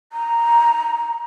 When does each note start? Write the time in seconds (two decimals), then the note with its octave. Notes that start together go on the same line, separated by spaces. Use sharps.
0.13 A#5